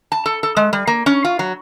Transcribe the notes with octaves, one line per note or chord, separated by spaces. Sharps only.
A5
A4
A4
G#3
G3
A#3
C#4
F4
F#3